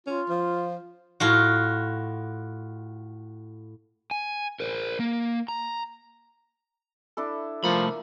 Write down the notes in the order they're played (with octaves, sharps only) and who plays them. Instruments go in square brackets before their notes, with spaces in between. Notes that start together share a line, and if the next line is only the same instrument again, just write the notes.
[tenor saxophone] C#4 [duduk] F4
[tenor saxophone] F3
[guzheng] A2 F4 F#4
[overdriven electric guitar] G#5
A#4 C5
A#3
A#5
[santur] D4 E4 A4
[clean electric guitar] C2 A3 B5 [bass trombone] F3 [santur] A#3